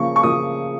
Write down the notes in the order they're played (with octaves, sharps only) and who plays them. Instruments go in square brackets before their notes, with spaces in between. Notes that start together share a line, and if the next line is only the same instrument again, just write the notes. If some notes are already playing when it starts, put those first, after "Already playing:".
Already playing: [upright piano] C#3 F3 A#3 C#6
C#6
C#3 F3 A#3 D#6